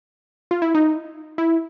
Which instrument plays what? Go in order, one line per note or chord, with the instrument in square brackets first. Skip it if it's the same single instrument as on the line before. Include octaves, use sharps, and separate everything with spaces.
[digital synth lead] F4
E4
D#4
E4